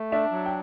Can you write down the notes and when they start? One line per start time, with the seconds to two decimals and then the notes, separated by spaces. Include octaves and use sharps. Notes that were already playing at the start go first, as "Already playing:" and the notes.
Already playing: A3
0.12 D4 D5 E5
0.32 F#3
0.46 G5